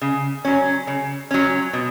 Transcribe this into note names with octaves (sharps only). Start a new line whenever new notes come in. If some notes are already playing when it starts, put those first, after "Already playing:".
C#3
F#3 C#4
C#3
F#3 C#4
B2